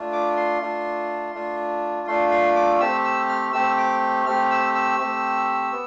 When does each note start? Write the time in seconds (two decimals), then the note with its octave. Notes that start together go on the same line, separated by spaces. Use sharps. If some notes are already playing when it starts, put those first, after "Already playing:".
Already playing: A3 D4 F4
0.13 D6
0.37 C6
0.61 A3 D4 F4
1.34 A3 D4 F4
2.07 A3 D4 F4 C6
2.31 C6
2.56 D6
2.80 A3 C4 G4 E6
3.04 E6
3.29 F6
3.53 A3 C4 G4 E6
3.78 D6
4.26 A3 C4 G4 F6
4.50 E6
4.74 E6
4.99 A3 C4 G4
5.72 B3